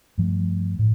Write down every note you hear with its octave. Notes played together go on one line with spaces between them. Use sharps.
G2 F3 A3
A2